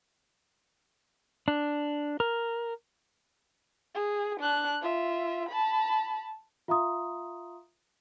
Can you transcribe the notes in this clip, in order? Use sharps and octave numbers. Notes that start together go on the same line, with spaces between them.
D4
A#4
G#4
D4 F#6
F4 E5
A5 B5
F4 E5 F5 A#5 C6 D#6